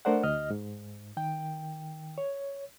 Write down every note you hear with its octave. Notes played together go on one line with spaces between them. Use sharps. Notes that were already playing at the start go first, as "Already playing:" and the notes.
A3 D4 A#4 C5 D5 F#5
D2 D#5 F6
G#2
D#3 G5
C#5